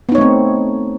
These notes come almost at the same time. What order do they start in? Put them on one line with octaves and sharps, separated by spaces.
B3 D#4 C#5 A3 C4